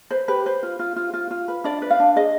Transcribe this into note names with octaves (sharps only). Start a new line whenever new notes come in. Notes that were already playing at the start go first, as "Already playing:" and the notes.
B4 C5
G4 B4
B4 C5
F4
F4
F4
F4
F4
B4
D4 D5
B4
F5
D4
G#4 D#5